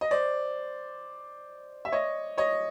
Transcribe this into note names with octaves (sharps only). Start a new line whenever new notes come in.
D#5
C5 D5
E5
C#5 D#5
C#5 D#5